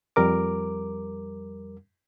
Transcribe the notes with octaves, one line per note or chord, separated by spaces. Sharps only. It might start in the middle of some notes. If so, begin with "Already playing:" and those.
F2 G3 A#4 D6